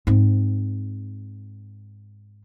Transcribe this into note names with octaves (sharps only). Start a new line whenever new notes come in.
G#2 C4